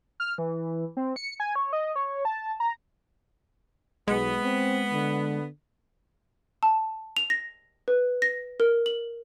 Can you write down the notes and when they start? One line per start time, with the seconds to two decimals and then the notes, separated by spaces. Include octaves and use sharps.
0.20 F6
0.38 E3
0.97 C4
1.16 C#7
1.40 G#5
1.55 C#5
1.73 D#5
1.96 C#5
2.25 A5
2.60 A#5
4.08 B1 G#3 B3
4.43 C4
4.92 D3
6.63 A5
7.17 F7
7.30 A#6
7.88 B4
8.22 A#6
8.60 A#4
8.86 F#7